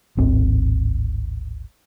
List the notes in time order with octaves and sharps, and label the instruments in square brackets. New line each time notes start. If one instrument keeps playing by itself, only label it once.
[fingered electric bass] D1 G#1 C4